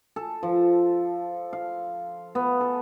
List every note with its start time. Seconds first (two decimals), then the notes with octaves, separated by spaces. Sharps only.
0.16 A4
0.43 F3
1.53 F5
2.35 B3
2.61 A4